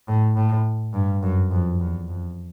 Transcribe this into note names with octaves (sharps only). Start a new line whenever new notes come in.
A2
A2
G2
F#2
F2
E2
F2